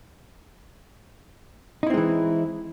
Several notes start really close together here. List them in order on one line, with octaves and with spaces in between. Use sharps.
D#4 E4 C4 G#3 E3